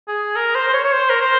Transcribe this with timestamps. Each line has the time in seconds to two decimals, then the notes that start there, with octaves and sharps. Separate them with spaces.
0.08 G#4
0.36 A#4
0.55 C5
0.68 C5
0.73 C#5
0.84 C#5
0.93 C5
1.10 A#4
1.21 C5